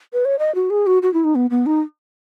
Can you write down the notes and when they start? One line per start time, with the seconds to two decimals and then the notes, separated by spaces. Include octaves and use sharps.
0.13 B4
0.25 C#5
0.39 D#5
0.55 F#4
0.70 G#4
0.87 F#4
1.03 F#4
1.14 E4
1.24 D#4
1.35 B3
1.50 B3
1.66 D#4